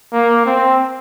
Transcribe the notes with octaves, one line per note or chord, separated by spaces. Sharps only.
A#3
C4